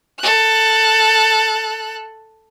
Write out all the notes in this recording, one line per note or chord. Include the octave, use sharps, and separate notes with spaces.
A4 F#6